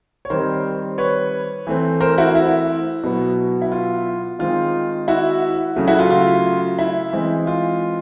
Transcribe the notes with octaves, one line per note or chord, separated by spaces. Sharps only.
C#5
D#3 G3 C4 A#4 C5
B4 C#5
E3 A3 C4
A#4 C5
E4 F#4
E4
B2 F#3 B3
E4
F4
D#3 G#3 C4 F4
E4 F#4
C#3 F#3 A3
E4 F#4
F4
F4
E4
E3 G#3 C4
F4